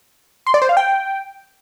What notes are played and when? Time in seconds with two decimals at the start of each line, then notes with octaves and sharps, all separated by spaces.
0.47 C6
0.54 D5
0.62 C5
0.69 F5
0.77 G5